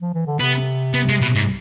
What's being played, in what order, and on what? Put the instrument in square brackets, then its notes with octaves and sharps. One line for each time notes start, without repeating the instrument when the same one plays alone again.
[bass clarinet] F3
E3
D3
[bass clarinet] C3 [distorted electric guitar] B3
[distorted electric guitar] B3
G#3
B2
G#2